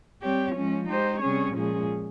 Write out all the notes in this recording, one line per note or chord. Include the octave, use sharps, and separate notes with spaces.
G3 C4 G4 C#5
F3 G#3 C#4
G#3 D#4 G4 C5
C3 G3 C#4 G#4 C#5
A#2 F3 G#3 C#4 G#4